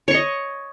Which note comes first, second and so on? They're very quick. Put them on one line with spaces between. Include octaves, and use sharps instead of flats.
C#5 C#6 D#5